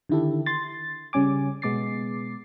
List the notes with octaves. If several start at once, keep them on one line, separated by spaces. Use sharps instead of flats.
D3 D#3 E4 G4 A4
C6 A6
C#3 G3 C#4 G#5 D6
B2 G#3 B3 D6 A6 C7